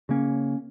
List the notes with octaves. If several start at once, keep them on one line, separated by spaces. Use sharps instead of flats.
C#3 A#3 C#4